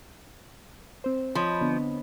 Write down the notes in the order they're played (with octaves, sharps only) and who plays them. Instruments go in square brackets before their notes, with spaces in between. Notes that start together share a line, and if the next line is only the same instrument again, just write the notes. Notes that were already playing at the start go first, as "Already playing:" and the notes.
[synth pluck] C4 C5
[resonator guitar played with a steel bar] F3 [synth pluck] C#5 D#5 B5
[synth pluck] D3 B3 D4